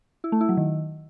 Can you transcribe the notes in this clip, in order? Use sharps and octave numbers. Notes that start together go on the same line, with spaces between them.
E4
A3
E4
F#3
D#3